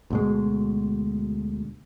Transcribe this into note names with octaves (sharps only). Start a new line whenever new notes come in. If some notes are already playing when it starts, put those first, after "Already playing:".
D2 B2 G#3